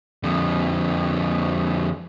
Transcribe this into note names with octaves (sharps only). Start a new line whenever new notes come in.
F2 D3